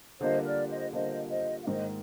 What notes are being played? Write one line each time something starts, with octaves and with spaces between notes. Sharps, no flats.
D3 G3 A#3 F4 C5 D#5
A#4 D5
C5 D#5
D3 G3 A#3 F4 C5 D#5
C5 D#5
F5
G#2 D#3 A#3 C5 D#5